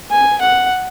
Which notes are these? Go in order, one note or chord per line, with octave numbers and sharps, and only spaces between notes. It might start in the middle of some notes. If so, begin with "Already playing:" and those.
G#5
F#5